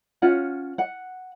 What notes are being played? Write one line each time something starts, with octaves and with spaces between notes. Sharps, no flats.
C#4 F4 F#5
F#5